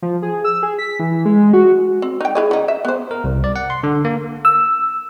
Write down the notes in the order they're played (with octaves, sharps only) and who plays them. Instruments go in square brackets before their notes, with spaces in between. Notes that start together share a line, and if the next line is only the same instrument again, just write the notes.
[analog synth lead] F3
G#4
E6
G#4
B6
E3
G#3
F#4
[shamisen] C4
D#4 G5
E4 G#4 D#5
C#3 D#4
E5
B3 C5
[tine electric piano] A#4
C2
D5
F#5
C6
D3
A#3
[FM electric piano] E6